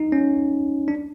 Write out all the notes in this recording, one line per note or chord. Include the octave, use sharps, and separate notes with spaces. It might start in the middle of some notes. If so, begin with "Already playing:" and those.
Already playing: D#4
C#4
D4